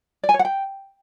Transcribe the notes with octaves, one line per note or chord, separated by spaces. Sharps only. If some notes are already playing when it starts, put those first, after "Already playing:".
D5
G#5
C#5
F#5
G5